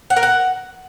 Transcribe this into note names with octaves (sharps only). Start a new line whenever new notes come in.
F#5
A#4
F#5